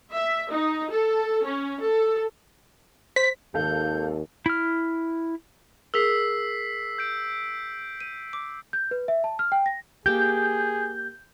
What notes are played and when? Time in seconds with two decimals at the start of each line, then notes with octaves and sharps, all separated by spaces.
0.13 E5
0.51 D#4
0.90 A4
1.44 C#4
1.80 A4
3.16 C5 B6
3.54 G#1 D#2 A4 F5 G6
4.46 E4 F6
5.94 G#4 A#4 E6 B6 C7
6.98 G6 D7
8.00 D#7
8.33 D6
8.73 G6
8.91 B4
9.08 E5
9.24 A5
9.39 F6
9.52 G5
9.66 A#6
10.06 A#3 G4 G#4 G6